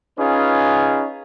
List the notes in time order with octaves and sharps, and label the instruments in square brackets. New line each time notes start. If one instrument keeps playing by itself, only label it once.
[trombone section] C#4 D#4 F4 G#4 B4